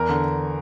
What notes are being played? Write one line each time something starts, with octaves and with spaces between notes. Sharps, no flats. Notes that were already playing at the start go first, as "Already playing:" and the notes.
Already playing: E2 A#4
D3